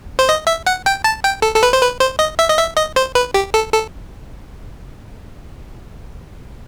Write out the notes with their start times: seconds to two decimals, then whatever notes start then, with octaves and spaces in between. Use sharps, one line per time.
0.19 C5
0.29 D#5
0.47 E5
0.67 F#5
0.86 G5
1.04 A5
1.24 G5
1.42 A4
1.56 A4
1.63 B4
1.73 C5
1.82 B4
2.00 C5
2.19 D#5
2.39 E5
2.49 D#5
2.58 E5
2.77 D#5
2.96 C5
3.15 B4
3.34 G4
3.54 A4
3.72 A4